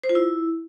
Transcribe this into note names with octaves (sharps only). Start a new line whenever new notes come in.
C5
F4
E4